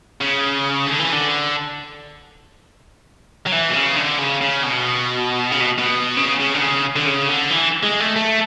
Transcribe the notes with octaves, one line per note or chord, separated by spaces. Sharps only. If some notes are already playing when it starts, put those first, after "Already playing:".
C#3
D3
E3
D3
F#3
E3
B2
C#3
D3
C#3
C#3
B2
C#3
B2
B2
C#3
C#3
D3
C#3
D3
C#3
D3
E3
G#3
A3
A3